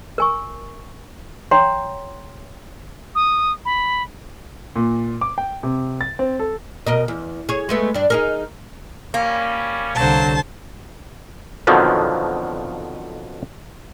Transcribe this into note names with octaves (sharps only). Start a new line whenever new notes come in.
A#4 G#5 C#6
C#5 F#5 G5 A#5 C6
D#6
B5
A#2
D6
G5
C3
A6
C4
A4
B2 A#4 D#5
E2
G#4 C#5
G#3 A3 B3
G2 D4
D#4 G#4 A#4
G3 A#3 C#4
C2 D3 F#3 C5 A5
F2 B2 D3 D#3 F3 F#3